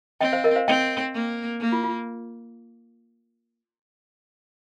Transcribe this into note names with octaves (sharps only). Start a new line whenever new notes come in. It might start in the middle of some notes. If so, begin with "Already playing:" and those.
C4 D#5 G5
C5 F5
A#4 D#5
C5 F5
C4 D#5 G5
A#3
A#3
F4
F4